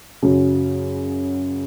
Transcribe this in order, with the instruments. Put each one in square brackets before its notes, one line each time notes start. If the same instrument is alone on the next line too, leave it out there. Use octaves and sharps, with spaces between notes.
[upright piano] F#2 C#3 F#3